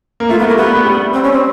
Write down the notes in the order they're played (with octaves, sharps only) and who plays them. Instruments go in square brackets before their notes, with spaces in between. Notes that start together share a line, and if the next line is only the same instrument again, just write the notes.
[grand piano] A#3
[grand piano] A3 [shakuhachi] F4
[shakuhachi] B3
[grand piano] A3 [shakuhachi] A#3
[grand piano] G3 [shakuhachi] B3
[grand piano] G3
[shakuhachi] C4
C#4
C4